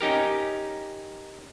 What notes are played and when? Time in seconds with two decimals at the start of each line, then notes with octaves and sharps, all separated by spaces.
0.01 C#4 D#4 G4 A#4